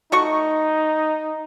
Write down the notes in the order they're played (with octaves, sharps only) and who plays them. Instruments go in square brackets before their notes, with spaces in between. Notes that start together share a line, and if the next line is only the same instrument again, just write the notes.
[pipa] A3 F#4 C#6 [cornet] D#4